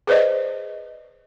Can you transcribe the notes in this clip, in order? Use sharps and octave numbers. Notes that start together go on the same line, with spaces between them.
G#4 B4 C5 D5 D#5